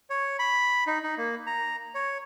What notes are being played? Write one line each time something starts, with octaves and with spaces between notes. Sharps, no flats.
C#5
B5
D#4
D#4
A#3
A#5
C#5